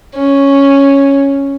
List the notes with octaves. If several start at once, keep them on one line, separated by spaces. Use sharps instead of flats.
C#4